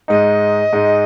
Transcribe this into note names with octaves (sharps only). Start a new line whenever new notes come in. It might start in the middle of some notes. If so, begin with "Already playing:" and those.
G#2 G#3 D#4 D#5
G#2 G#3 D#4